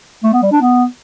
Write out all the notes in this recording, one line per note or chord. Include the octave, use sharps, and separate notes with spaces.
A3
B3
G3
D4
B3